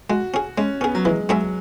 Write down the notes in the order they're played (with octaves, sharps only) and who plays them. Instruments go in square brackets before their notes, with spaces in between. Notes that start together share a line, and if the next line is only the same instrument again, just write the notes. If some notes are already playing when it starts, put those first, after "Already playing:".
[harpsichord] G#3 [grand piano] F#4
[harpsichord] C#4 G#4
[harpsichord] G#3 [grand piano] C#4
[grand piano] B3 [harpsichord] C#4 G#4
[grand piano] F#3
[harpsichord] E3 [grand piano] G#3
[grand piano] F#3 [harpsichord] G#3 C#4 G#4 E5